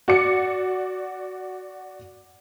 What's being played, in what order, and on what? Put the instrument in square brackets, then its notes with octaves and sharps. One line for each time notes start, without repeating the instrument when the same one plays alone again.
[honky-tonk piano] F#4 D5 C#7